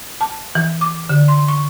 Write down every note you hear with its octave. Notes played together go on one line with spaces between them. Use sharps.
A5
E3
D6
D3
C6
C#6